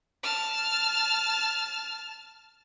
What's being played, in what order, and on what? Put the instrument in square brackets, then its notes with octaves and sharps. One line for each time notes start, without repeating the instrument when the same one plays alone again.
[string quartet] A5 F6